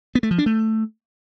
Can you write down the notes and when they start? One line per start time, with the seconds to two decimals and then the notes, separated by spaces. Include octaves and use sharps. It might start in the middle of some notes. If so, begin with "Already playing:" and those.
0.15 B3
0.23 A3
0.31 F3
0.38 D4
0.46 A3